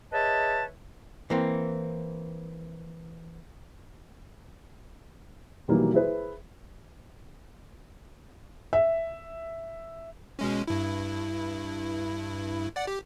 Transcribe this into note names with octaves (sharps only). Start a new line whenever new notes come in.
G#4 B4 C#5 D#5 E5 A5
E3 A#3 C4
B2 D#3 E3 F#3 G3 A#3
E4 G#4 B4 C5
E5
B2 G#3 C#4
G2 E4
D5 F#5
G4